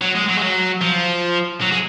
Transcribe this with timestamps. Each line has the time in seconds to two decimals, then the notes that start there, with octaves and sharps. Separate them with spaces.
0.01 F#3
0.15 G#3
0.28 F#3
0.37 G#3
0.42 F#3
0.82 F3
1.62 F#3
1.72 G#3